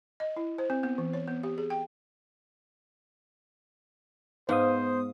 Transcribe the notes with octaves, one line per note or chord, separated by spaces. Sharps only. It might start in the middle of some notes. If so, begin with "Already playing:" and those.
D#5
E4
C5
C4
B3
E3
C#5
B3
G4
G#4
G5
G#2 B3 C5 F5 D#6